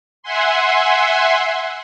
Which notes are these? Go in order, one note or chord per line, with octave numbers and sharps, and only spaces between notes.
E5 F#5 G#5 C6